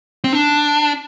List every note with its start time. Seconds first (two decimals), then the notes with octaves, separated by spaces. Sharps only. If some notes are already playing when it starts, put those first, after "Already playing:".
0.24 C4
0.33 D4